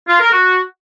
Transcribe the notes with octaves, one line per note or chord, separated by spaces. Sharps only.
F4
A#4
F#4